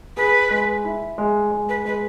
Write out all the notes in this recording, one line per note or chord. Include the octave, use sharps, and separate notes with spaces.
G#4 B4
G#3
E4
G#3
G#3
B4
G#3 B4